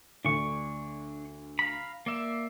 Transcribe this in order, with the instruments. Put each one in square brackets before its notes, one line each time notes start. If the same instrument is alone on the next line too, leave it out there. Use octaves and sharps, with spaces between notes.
[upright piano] D2 [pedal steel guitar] D4 C#6
[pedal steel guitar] F5 A#5 B5
A#3 D5 E5